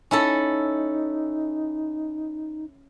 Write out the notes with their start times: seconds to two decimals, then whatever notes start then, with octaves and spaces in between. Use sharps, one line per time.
0.11 C#4 D#4 E4 A4